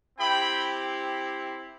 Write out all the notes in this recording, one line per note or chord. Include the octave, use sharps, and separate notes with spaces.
C4 E4 G4 G5 B5